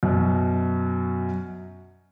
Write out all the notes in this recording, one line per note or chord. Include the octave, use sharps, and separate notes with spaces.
F#2 B2